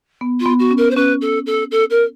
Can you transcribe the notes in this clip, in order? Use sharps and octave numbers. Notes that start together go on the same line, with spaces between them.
B3
F4
B3
F#4
C#4
A#4
C5
C#4 B4
A4
A4
A4
A#4